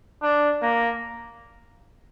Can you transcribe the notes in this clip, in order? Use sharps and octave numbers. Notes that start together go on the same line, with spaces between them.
D4
A#3